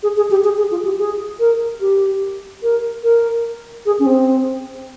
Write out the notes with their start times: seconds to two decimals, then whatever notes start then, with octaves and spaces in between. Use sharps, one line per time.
0.03 G#4
0.17 G#4
0.31 G4
0.44 G#4
0.58 G#4
0.71 F4
0.85 G4
0.99 G#4
1.40 A#4
1.81 G4
2.63 A#4
3.04 A#4
3.86 G#4
3.99 C#4
4.06 C4